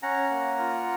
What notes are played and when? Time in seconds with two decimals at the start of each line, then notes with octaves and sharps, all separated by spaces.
0.02 C#4 F#5 A#5
0.30 A#3
0.59 F4